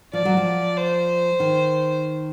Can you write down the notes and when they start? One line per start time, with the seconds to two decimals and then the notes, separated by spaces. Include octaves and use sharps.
0.13 F3 D5
0.25 F#3
0.37 F3
0.77 C5
1.40 D#3